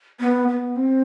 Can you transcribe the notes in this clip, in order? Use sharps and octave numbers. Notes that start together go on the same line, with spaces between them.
B3
B3
C4